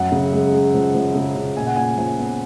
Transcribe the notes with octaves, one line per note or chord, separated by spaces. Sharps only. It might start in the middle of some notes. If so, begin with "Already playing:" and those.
Already playing: F#2 F#5
C#3
G#3
G#3
F3
F3
C#3
C#3
A#2 G#5
F#5
A#2 G#5
F3
B3